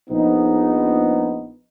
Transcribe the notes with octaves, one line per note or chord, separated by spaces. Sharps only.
A#1 B3 D#4